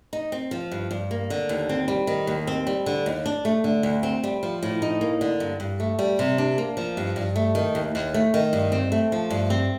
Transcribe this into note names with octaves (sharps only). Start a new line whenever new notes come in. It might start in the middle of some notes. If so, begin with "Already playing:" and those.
D#4
C4
F3
G2
G2
A#3
D3
D#2
C4
G3
D#3
D#2
C4
G3
D3
D#2
D4
A3
D3
D2
C4
G3
F3
A2
D#4
A#3
D3
G2
G2
A3
G3
C3
D4
A#3
F3
G2
G2
A3
D#3
D#2
D#2
A3
D#3
G2
C4
A3
F3
G2
C4